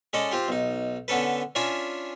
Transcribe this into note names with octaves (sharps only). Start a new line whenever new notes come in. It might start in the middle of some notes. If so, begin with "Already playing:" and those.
G#3 C#4 A4 D5 D#5
C4 F4 G4
B1 D#4
D3 B3 C#4 A4 B4
C#4 D4 F4 E5 G#5 B5